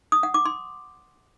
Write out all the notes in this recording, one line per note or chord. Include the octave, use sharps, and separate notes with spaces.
D#6
F#5
D6
C6